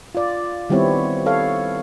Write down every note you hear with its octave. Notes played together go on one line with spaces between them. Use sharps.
F4 D5
D#3 G3 B3 C4 E4 C#5
A4 C#5 F5